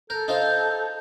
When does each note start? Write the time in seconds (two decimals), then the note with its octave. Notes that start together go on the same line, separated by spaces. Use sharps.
0.10 A4 A#4 G6
0.28 D#4 F4 C5